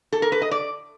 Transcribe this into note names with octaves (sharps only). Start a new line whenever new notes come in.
A4
A#4
B4
D#5
D5